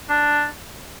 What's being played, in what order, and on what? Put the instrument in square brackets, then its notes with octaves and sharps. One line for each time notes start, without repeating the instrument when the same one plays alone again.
[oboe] D4